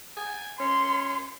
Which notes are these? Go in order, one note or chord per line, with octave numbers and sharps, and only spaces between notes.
G#5
C#4 C6